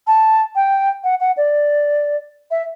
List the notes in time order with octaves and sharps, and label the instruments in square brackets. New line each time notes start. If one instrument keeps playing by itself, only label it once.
[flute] A5
G5
F#5
F#5
D5
E5